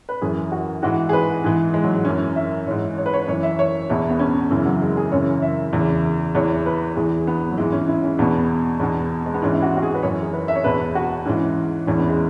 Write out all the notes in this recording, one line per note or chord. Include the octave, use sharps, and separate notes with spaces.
B4
F#2 E3 G#4
F#4
G#2 E3 F#4
G#4
B4
G#2 E3 G#4
G#3
F#3
G#3
F#2 E3 C#4
E5
G#2 E3 C#5
C#5
B4
C#5
F#2 E3 C#5
E5
C#5
E2 B2 E4
B3
C#4
F#2 C#3 E3
F#3
G#3
G#4
F#2 C#3 E3 C#5
E5
E2 C#3 E3
E2 E3 C#5
B4
E2 E3 G#4
B3
F#3
G#2 E3 G#3
C#4
E4
C#4
E2 B2 B3
E2 B2
G#3
B3
G#2 E3 C#4
E4
F#4
F#4
G#4
B4
F#2 E3 C#5
G#4
B4
E5
C#5
E2 B2 B4
F#4
G#2 E3 C#4
E2 E3 C#4
B3
G#3